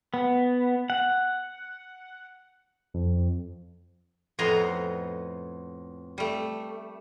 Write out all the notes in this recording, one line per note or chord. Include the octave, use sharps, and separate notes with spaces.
B3
F#5
F2
F2 A2 B3 D#5 A#5 C6
G3 A3